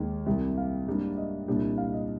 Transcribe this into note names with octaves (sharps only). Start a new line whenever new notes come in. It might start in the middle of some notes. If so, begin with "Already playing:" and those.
Already playing: D#2 D#3 G#3
C2 C3 G3
F5
G#2 G3 A#3 D4
D#5
C2 A#2 G3 D4
F5
D#5